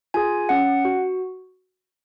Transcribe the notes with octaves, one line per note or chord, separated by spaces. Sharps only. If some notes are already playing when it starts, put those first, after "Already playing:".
F4 G#4 G#5
C#4 F#5
F#4